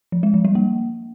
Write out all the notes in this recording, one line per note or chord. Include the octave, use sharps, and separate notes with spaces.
F3
G#3
F3
G3
A#3